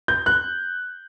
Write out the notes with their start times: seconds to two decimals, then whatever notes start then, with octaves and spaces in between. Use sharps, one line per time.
0.08 G6
0.26 F#6